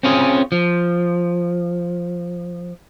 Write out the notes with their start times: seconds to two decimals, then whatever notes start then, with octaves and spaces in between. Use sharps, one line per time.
0.03 C4 C#4 F4 G#4
0.52 F3